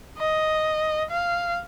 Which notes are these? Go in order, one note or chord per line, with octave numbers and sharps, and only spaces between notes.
D#5
F5